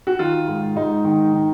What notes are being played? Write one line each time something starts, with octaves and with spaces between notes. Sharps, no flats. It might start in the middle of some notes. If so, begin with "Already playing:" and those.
F#4
D#3 F4
G#2
G#2 D#4
D#3
D#3